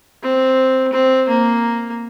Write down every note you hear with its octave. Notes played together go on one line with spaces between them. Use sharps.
C4
C4
A#3